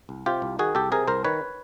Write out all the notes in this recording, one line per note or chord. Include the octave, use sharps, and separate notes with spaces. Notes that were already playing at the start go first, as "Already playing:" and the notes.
C2
C3 F4 G4
C2
D#3 F#4 G#4
C2 G4 A4
C3 G#4 A#4
C2 A#4 C5
D#3 B4 C#5